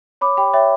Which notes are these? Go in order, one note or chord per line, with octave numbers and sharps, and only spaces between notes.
C#5 B5 D6
G4 G5 B5
C#5 E5 G5